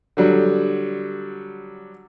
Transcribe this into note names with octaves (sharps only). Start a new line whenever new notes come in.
D3 F#3 G3